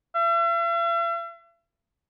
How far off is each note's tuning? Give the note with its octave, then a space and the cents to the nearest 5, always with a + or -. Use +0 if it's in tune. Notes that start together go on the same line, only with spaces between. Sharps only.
E5 +45